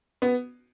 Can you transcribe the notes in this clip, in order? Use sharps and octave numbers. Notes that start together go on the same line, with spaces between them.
B3